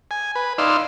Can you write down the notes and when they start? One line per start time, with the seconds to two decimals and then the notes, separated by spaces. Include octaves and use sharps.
0.11 G#5
0.35 B4
0.58 D#4 D5 F5 C6 E6